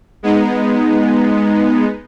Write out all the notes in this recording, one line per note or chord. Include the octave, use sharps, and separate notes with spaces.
G#3 B3 D#4